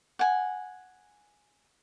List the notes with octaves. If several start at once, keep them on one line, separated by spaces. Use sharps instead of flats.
F#5 G#5